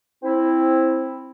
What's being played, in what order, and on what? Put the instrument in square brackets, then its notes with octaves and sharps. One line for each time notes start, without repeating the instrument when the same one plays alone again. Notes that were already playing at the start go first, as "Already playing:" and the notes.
[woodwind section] C4 E4